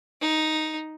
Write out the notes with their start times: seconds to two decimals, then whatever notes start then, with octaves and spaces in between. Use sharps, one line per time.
0.21 D#4